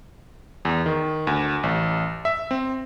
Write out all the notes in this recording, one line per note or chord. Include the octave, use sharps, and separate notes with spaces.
E2
D#3
D2
A1
E5
C4